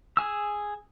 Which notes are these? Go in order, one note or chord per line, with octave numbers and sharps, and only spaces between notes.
G#4 G#5 E6